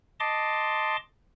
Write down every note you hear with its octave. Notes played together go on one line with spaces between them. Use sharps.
D#5 A5 C6 D6